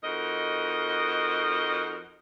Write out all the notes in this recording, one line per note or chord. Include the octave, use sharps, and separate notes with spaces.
F2 D#4 F#4 A#4 D#5